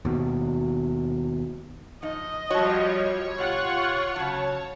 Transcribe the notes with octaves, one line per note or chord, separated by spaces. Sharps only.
D#2 B2
F3 D#4 D#5
F3 G3 F#4 C#5 A5
B2 F4 G4 F#5 C#6
C#3 F#3 A5